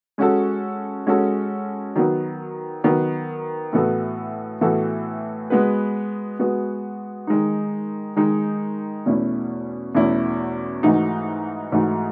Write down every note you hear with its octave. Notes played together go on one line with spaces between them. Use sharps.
G#3 C#4 F#4 A4
G#3 C#4 F#4 A4
D#3 F#3 B3
D#3 F#3 B3
A2 E3 B3 F#4 A4
A2 E3 B3 F#4 A4
G#3 B3 F#4 B4
G#3 B3 F#4 B4
D#3 G#3 D#4
D#3 G#3 D#4
E2 B2 A3 C#4 E4
E2 B2 A3 C#4 E4
G#2 E3 A3 D#4 F#4
G#2 E3 A3 D#4 F#4